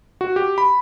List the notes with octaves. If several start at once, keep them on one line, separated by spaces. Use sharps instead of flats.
F#4
G4
B5